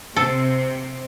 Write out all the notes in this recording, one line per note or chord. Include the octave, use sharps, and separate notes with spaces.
C3 C4 A4